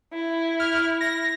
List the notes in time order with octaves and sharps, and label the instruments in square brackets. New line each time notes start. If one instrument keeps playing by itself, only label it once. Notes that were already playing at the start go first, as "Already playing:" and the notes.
[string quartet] E4
[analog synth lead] F6
A#6